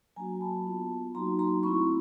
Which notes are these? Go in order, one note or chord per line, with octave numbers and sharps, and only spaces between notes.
F#3 A#3 D4 F#4 G#5 A#5
A5 B5
B3 D4 F4
F#3 A#3 D#4 F#4 A#5 C6
A#5 C6
A3 C4 E4 B5 C#6